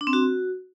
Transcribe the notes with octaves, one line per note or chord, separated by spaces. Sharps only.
D4
C4
F#4